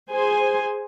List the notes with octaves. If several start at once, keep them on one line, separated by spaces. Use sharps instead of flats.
G#4 C5 G#5